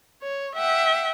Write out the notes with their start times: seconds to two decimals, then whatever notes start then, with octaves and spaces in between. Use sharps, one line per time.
0.23 C#5
0.56 E5 F#5 G5